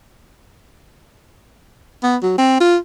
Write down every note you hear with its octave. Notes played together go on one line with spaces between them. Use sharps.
B3
F#3
C4
F4